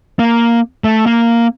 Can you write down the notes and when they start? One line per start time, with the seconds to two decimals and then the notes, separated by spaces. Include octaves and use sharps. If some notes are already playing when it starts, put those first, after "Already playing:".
0.19 A#3
0.84 A3
1.06 A#3